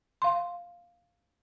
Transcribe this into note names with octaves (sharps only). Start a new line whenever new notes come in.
F5 C6